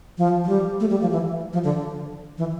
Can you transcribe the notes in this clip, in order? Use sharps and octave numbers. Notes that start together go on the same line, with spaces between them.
F3
F3
G3
A3
G3
F3
E3
F3
D3
E3